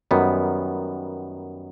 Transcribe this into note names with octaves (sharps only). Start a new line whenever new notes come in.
F#2 D#3 G3 B3